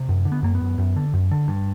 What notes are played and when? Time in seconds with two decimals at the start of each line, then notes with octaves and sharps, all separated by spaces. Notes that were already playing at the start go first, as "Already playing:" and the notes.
Already playing: C3
0.09 F#2
0.25 D3
0.32 B3
0.43 F#2 A#3
0.55 B3
0.61 F#2
0.78 F#2
0.96 D3
1.13 F#2
1.31 D3
1.48 G2